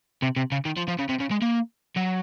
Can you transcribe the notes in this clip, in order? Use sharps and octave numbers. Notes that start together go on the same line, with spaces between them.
C3
C3
C#3
D#3
F3
F3
C#3
C3
C#3
G#3
A#3
F#3